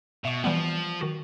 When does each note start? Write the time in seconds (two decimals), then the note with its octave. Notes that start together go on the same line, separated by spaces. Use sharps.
0.25 B2 E5 C#6
0.44 E3 F3 G3 B3
1.01 D#3 F#4